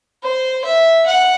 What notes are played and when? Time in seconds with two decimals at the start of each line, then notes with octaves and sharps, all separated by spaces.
0.23 C5
0.65 E5
1.06 F#5